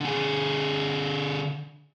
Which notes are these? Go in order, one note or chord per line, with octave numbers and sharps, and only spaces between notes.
D3 G#4